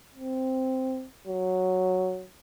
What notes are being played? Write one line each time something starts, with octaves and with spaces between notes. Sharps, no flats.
C4
F#3